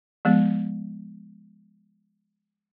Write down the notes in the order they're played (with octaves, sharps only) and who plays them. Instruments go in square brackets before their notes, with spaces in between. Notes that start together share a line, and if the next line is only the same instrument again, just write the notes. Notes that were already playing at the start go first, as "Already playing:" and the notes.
[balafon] F3 G#3 B3